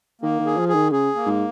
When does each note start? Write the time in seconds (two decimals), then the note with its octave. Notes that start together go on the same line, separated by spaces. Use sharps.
0.22 D#3 A#3
0.39 D#3
0.46 G#4
0.57 F3
0.69 G#4
0.74 D#3
0.92 C#3 G#4
1.15 A#3
1.26 G#2